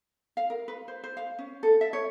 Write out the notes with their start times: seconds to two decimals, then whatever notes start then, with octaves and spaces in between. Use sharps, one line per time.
0.37 F5
0.50 A#4
0.68 B4
0.88 C5
1.04 C5
1.17 F5
1.39 C#4
1.63 A4
1.81 E5
1.93 C#5